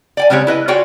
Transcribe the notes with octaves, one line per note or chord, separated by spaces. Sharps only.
D5 G5 G#5
C#3 G3 G#3 C4 G4 C#5
E4 B4 D#5
F4 F#4 G#4 C#5 D5 G5